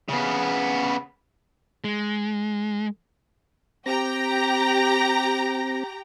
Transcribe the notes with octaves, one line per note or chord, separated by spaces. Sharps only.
C#3 B3
G#3
C4 G4 G5 A#5 A#6